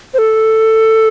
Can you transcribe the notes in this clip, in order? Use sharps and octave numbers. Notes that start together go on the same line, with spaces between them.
C5
A4